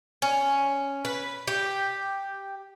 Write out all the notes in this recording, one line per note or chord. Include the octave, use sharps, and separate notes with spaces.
C#4
B4
G4